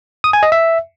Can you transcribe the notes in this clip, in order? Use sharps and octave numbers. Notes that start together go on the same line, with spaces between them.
D#6
G#5
D#5
E5